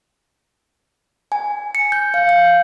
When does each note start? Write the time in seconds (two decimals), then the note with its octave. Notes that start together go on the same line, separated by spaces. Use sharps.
1.32 G#5
1.75 C#7
1.92 G6
2.14 F5
2.29 G6